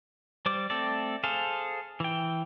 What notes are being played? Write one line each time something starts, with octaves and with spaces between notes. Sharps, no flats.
G3 C5 D5 D6
A3 C4 A4 D5
G#4 A4 C5 F5
E3 G5